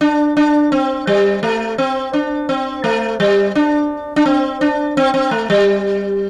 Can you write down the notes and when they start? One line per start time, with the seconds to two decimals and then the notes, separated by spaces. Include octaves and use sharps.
0.01 D4
0.37 D4
0.72 C4
1.07 G3
1.43 A3
1.78 C4
2.13 D4
2.49 C4
2.84 A3
3.20 G3
3.55 D4
4.16 D4
4.26 C4
4.61 D4
4.97 C4
5.14 C4
5.31 A3
5.50 G3